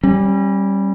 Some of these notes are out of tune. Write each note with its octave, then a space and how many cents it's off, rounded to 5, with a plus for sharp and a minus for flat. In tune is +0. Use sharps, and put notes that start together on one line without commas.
G3 -5 C#4 -30